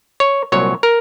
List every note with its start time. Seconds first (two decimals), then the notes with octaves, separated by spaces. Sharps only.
0.20 C#5
0.52 C2 A#2 F#3 C#5
0.83 A#4